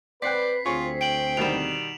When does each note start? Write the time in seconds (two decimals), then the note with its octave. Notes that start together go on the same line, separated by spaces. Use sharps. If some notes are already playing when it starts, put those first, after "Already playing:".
0.22 C4 B4 D5 F#5 G5 B6 C7
0.66 D2 C4 F4 G#4 C#5 C#6
1.01 G5 D7 F#7
1.37 B2 D#3 G3 E7 F7